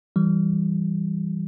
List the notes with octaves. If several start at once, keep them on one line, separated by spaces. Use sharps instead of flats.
E3 G3